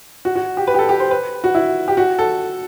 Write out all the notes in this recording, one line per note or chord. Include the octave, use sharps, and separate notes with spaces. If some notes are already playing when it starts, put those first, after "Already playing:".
F#4
F#4
G4
B4
G4
A4
G4
C5
B4
F#4
E4
G4
F#4
A4